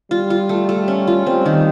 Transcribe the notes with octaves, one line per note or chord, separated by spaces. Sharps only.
G3 F4
F4
A3
A3
C#4
F4
G3 C4
D#3